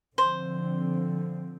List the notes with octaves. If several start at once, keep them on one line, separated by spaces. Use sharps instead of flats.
D3 F3 C4 C5